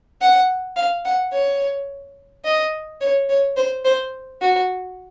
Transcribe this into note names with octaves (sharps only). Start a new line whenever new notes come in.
F#5
F5
F#5
C#5
D#5
C#5
C#5
C5
C5
F#4